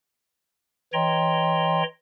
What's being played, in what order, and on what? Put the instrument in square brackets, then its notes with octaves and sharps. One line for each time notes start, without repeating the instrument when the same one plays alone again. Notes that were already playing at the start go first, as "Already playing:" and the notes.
[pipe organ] E3 C#5 D#5 G5 A#5 C6